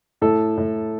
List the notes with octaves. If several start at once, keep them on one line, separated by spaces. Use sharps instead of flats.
A2 A4
A2